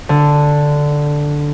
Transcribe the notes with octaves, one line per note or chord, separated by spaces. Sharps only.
D3